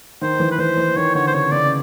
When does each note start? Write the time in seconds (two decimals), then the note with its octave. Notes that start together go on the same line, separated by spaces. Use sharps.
0.21 D#3 C5
0.40 E3
0.51 B4
0.58 E3 C5
0.77 E3
0.96 D#3 C#5
1.15 D3 C#5
1.27 C5
1.34 C#3 C#5
1.52 C#3 D5